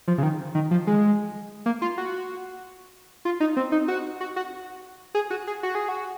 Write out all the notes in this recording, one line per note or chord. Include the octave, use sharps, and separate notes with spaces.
F3
C#3
D#3
D#3
F3
G#3
A#3
F4
F#4
F4
D#4
C4
D#4
F#4
F#4
F#4
G#4
F#4
G#4
F#4
G#4
F#4